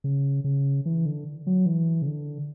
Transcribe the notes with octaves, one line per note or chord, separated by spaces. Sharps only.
C#3
C#3
E3
D3
F#3
E3
C#3
D3